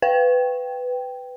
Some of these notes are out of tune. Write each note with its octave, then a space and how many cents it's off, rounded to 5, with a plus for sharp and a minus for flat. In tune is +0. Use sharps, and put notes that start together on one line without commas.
B4 +15 G5 +0